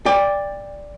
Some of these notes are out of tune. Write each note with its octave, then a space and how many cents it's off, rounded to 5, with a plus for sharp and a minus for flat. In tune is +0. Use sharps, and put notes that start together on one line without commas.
D5 +0 G5 +30